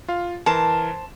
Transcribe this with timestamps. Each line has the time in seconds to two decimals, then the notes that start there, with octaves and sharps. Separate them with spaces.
0.08 F4 F5
0.46 E3 A#4 C5 A5 E7